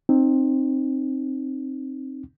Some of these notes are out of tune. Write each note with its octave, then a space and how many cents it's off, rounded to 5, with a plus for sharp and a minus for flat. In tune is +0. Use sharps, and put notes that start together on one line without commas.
C4 +15 D#4 -15